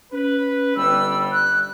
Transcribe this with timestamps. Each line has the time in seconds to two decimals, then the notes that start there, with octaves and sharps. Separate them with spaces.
0.13 C#4 B4
0.77 G1 G3 E6
1.33 F#6